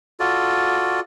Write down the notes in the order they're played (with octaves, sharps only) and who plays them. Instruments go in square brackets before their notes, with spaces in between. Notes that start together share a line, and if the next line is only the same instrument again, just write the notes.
[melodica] F4 F#4 A4 D5